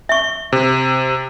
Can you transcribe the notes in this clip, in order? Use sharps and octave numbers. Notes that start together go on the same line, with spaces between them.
E5 C#6
C3